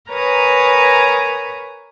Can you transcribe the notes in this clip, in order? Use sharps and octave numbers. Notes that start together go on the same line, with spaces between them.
A#4 B4 C#5 G#5 A#5 D#6